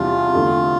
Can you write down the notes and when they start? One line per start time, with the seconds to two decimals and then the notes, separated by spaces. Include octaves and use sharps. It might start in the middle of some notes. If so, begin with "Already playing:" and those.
Already playing: E2 C3 E3 G3 D4 F4
0.34 E2 D3 A3